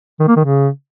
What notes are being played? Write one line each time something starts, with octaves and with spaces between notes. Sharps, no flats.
D#3
A#3
D#3
C#3